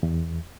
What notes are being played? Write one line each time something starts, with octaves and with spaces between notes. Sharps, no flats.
E2